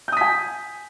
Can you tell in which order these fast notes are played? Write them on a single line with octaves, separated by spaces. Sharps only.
G6 D#6 B6 G#5